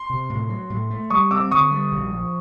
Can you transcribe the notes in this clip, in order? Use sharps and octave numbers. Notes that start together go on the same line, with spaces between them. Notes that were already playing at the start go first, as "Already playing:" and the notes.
Already playing: C6
C3
A2
F#3
A2
A3
G3 C#6 D#6
C4 D6 E6
D3 C#6 D#6
G3
A#1
F3